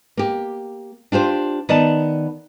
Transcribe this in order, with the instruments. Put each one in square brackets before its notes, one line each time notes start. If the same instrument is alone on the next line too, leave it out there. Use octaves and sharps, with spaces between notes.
[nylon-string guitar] A#3 G4
D4 F4 G4 C5
D#3 B3 D5 A5